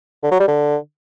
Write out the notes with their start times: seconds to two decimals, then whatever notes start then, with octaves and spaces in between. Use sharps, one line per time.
0.23 D3
0.32 F#3
0.40 G3
0.48 D3